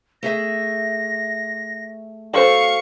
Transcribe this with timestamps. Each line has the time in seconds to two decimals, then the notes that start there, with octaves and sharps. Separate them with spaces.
0.23 A3 G#4 E5 A#6
2.34 F#4 A4 C5 F5 C#6